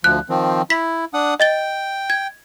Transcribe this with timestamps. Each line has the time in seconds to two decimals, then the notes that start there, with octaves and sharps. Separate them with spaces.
0.04 D2 F3 F#6
0.29 D#3 F3 C4
0.70 E4 B6
1.14 D4 F#5 D#6
1.40 D#5 G5 A6 G7
2.10 G#6